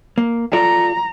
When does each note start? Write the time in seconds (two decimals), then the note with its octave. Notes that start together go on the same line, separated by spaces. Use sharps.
0.18 A#3
0.53 F4 A4 D5 A#5